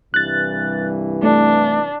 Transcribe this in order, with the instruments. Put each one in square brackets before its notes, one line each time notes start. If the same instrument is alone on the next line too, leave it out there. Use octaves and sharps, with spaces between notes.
[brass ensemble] C2 G2 E3 [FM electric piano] F#6 A6
[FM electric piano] A3 [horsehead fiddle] D4